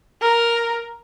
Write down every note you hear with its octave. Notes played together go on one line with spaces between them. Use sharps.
A#4